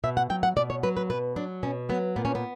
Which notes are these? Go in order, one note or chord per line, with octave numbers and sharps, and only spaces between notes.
B2 E5
F#5
F#3 G5
F#5
B2 D5
C#5
F#3 B4
B4
B2 B4
F#3 D4
B2 C#4
F#3 B3
A#2 B3
C#4
B3